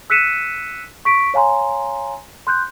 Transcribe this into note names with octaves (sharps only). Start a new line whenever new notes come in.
E6 F#6 B6 C#7 D#7 E7
C#6 B6 D7
C#5 F5 G#5 A#5 C6
C6 F#6 G6